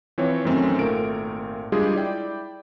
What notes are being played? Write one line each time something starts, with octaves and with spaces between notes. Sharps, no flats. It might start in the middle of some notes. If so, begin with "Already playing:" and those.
E3 F3 C4 C#5
F#2 D#3 A3 C4 C#4 C6
G#1 A#2 A3 A#4 D7
G3 G#3 D4 F4 G4 G#4
E4 D5 G5